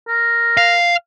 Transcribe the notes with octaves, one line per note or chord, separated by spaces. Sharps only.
A#4
F5